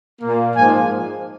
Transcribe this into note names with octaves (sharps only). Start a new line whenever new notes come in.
A#2 A#3
G#2 F3 A#3 G#5